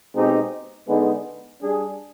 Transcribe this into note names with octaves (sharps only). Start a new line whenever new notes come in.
B2 G#3 C4 D#4 G4
D3 G#3 B3 D#4
G3 D4 G#4